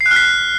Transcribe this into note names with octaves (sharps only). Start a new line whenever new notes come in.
C7
F#6
F6
B6